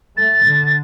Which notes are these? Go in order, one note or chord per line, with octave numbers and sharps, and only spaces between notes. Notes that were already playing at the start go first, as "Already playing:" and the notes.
A3 A6
D3